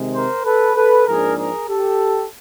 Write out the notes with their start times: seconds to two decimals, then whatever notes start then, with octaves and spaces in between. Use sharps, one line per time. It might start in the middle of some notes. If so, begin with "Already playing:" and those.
Already playing: C3 D#3 G#3
0.14 A#4 C5
0.45 A4 B4
0.76 A4 B4
1.07 G#2 F3 A#3 D4 G#4 A#4
1.38 G#4 A#4
1.69 G4 A4